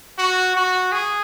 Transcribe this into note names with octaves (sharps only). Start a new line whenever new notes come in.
F#4
F#4
G#4